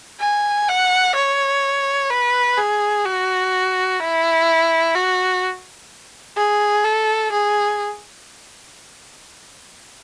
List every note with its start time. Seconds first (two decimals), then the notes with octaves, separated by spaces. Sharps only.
0.20 G#5
0.68 F#5
1.15 C#5
2.11 B4
2.58 G#4
3.05 F#4
4.00 E4
4.95 F#4
6.37 G#4
6.85 A4
7.32 G#4